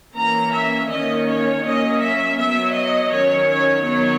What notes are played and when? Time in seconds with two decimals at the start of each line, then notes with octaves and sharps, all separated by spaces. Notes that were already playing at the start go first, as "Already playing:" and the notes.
0.15 E3 A#3 C#4 A#5
0.53 E5
0.89 D#3 A#3 C#4 D#5
1.27 C#5
1.64 F#3 A#3 C#4 D#5
2.01 E5
2.37 F#3 B3 E5
2.74 D#5
3.11 D#3 F#3 C#4 C#5
3.49 C#5
3.85 D#3 F#3 B3 C#5